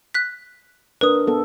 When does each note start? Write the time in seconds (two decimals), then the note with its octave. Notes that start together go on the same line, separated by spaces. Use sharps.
0.14 F#6 B6
1.01 D4 A#4 B4 D#6
1.27 B3 A4